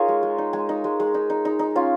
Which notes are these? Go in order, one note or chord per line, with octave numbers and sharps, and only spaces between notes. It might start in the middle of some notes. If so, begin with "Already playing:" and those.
Already playing: D#4 F4 G#4 A#4 C#5
G#3
G#3
D#4
G#3 G#4
D#4
G#3
G#3
D#4
D#4
D#4
D#4
C#4 F4